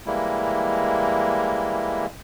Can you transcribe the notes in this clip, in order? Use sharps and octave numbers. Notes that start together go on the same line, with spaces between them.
E3 G3 G#3 A#3 E4